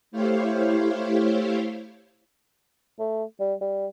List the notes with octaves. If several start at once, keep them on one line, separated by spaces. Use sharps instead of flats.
A3 E4 G4 C5 C#5 F5
A3
G3
G3